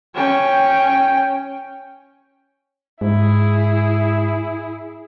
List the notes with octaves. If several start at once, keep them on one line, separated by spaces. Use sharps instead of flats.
C#4 G5
G#2 E4 G#4